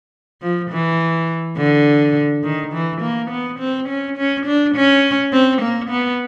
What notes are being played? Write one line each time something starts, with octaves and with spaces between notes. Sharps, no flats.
F3
E3
D3
D#3
E3
A#3
B3
C4
C#4
C#4
D4
C#4
C4
A#3
B3